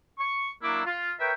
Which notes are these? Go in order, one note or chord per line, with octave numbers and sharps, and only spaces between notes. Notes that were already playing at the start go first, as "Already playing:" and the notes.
C#6
F#3 A#3 D4 E4 E5 D6
F4
A#4 B4 C#5 E5 G5